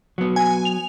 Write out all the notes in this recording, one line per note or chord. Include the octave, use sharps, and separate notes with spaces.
F#3 B3
G#5
F7